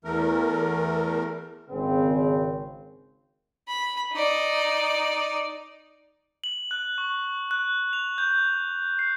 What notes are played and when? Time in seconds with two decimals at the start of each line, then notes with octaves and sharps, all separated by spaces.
0.04 E2 E3 A3 A#4
1.70 G#1 C#3 C4
3.68 B5
4.13 D#4 D5
6.44 F#7
6.71 F#6
6.98 C#6
7.51 F#6
7.93 F7
8.18 G6
8.99 C7